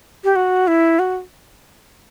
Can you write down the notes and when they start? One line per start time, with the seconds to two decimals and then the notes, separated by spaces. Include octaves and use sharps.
0.24 G4
0.36 F#4
0.67 E4
0.99 F#4